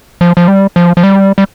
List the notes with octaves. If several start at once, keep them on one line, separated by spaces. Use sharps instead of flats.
F3
F3
G3
F3
F3
G3
G3